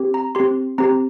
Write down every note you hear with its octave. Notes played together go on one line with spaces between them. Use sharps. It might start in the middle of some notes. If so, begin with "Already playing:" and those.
Already playing: C4 G4
A#5
C4 G4 C6
C4 G4 A#5